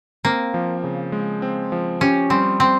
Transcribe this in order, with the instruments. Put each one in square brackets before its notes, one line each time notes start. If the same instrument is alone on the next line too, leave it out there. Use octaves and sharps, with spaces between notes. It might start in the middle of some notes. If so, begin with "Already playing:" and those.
[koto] A#3 [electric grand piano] C4
[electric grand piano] F3
C#3
G#3
C4
F3
[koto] C#4 [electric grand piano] G4
[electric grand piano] G3 [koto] C4
[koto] C4